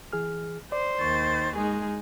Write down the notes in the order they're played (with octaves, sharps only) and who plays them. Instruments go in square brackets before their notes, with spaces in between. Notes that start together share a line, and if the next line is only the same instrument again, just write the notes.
[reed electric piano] E3 G#4 F6
[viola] C5 [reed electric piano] D5
[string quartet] D#2 D#3 A6 [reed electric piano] C#6
[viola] G#3 [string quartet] D#4 G#4